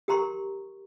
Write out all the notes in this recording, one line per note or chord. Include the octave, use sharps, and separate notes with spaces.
G4 A#4 A#5 C6 C#6